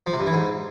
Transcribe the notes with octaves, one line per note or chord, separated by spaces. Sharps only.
F3
C3
G2
E3
G#2